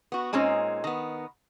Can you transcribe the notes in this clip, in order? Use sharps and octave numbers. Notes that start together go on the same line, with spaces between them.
B3 F#4
A#2 G#3 C4 C#4 D#4
D#3 B3